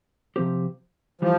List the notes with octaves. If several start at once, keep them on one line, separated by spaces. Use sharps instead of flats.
C3 F3 C4 G4 C5
E3 F3 G3